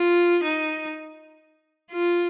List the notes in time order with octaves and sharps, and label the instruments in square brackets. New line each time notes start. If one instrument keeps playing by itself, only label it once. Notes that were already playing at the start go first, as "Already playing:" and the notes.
Already playing: [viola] F4
D#4
F4